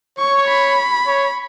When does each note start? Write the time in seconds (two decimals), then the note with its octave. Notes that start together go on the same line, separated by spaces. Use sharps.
0.19 C#5 C#6
0.48 B5
1.06 C#5